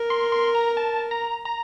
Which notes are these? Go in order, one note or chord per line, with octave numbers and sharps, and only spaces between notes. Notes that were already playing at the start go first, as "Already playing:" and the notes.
Already playing: A#4
C6
C6
A#5
A5
A#5
A#5